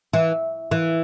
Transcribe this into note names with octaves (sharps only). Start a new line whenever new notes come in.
E3
E3